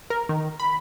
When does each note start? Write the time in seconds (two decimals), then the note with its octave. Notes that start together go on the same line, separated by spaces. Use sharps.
0.10 A#4
0.29 D#3
0.60 B5